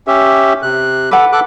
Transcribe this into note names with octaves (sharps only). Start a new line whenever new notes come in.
C#4 G4 E5
C3 F#6
A4 B4 F#5 D6
A4 D6 F#6